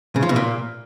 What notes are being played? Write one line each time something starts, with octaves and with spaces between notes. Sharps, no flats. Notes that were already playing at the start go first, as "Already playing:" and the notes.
C#3
F3
B2
A#2